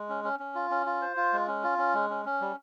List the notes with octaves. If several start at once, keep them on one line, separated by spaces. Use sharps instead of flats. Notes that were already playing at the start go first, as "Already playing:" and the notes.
Already playing: G#3
C#4
C#4
C#4
F4
C#4
F4
C5
F4
G#3
C#4
F4
C#4
G#3
C#4
C#4
G3